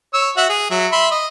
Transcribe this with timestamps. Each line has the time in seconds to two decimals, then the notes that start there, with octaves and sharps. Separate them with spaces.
0.13 C#5 E6
0.37 F#4 E5 F#5
0.49 G#4
0.71 F#3 E5
0.92 E5 B5 C6
1.11 D#5